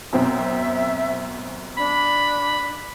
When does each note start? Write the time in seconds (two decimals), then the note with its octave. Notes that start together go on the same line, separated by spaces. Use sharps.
0.13 F#2 B2 C4 E5
1.77 D4 B5